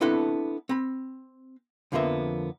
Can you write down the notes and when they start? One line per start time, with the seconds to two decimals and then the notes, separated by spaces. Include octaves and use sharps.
0.01 B3 C4 D4 E4 A4 F#5
0.69 C4 B5
1.92 F2 D3 F3 A#3 B3 E5